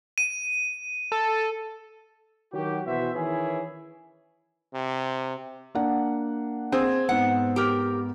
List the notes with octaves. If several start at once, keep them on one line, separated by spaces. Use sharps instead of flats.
D#7
A4
D#3 F#3 F#4 G4
B2 E3 F#4 C5 E5
D#3 E3 C#4 E4 G#4
C3
A#3 D4 F#5
C4 G#4
G#2 B3 F#5
G4 A#4